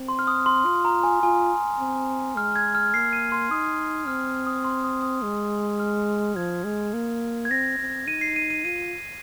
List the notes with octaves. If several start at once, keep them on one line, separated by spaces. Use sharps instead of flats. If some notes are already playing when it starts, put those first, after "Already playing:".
Already playing: C4
C6
F6
D#6
C6
F4 C6
A#5
G#5
F4 G#5
C4
G#3 F6
G#6
F6
A#3 C7
D#7
C6
D#4 D#6
C4 F6
F6
D#6
C6
D#6
D#6
G#3 D#6
F6
F3 G#6
G#3
A#3
G#6
C4 A#6
C4
D#4 D#7
C7
D#7
D#7
F4 D#7